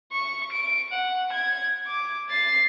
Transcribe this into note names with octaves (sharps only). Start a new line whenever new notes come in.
C#6
D7
F#5
G#6
D6
A6 C7